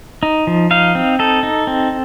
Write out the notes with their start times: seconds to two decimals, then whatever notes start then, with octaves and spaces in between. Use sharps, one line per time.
0.23 D#4
0.47 F3
0.71 D#4 F5
0.95 C4
1.19 D#4 A4
1.43 D#4
1.67 C4